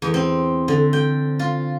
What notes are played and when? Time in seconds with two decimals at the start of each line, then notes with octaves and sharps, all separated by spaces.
0.02 E2
0.14 C4
0.68 D3
0.93 G5
1.39 F4